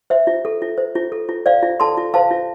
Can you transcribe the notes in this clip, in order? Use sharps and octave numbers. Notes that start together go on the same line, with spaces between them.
C5 E5
F4
A4
F4
C5
F4
A4
F4
C5 D5 F5
F4
A4 A5 C6
F4
C5 F5 A5
F4